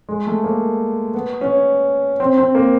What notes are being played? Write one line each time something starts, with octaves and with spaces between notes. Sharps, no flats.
G#3
A3
A#3
B3
C#4
C4
C4
A#3